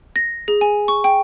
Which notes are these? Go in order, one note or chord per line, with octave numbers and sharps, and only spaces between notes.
A#6
G#4
G#5
C#6
G5